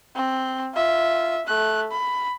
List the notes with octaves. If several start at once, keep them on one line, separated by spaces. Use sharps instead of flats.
C4
F4 E5
A3 F#6
B5